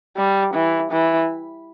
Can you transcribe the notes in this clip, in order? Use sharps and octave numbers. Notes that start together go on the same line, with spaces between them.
G3
E3
E3